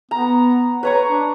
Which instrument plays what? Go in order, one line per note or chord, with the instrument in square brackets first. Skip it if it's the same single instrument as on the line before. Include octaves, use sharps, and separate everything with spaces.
[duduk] B3 [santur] A#5
[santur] B4 A#5 C#6 [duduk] C#5
[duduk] D4